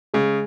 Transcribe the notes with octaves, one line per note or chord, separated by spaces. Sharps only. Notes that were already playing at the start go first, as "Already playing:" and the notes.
C#3 G#3